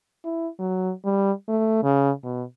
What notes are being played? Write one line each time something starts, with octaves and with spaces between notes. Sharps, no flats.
E4
F#3
G3
A3
C#3
B2